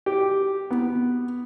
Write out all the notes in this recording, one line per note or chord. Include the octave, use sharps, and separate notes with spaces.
G4
B3